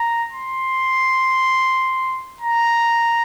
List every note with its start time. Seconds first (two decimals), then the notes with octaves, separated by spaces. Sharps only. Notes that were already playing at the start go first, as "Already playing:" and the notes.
Already playing: A#5
0.32 C6
2.41 A#5